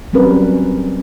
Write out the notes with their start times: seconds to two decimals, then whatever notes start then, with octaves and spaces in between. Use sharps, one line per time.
0.13 F#3 G3 C4 C#4 A#4 B4